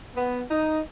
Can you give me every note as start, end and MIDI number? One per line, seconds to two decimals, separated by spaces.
0.15 0.40 59
0.50 0.80 63